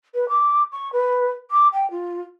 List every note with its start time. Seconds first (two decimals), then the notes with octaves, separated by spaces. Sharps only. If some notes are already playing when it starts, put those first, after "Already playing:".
0.14 B4
0.28 D6
0.72 C#6
0.93 B4
1.51 D6
1.73 G5
1.91 F4